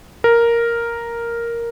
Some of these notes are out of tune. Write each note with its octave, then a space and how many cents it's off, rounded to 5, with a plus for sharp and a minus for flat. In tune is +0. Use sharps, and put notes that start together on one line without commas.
A#4 +0